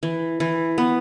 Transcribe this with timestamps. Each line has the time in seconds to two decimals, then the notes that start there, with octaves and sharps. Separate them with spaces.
0.03 E3
0.40 E3
0.78 B3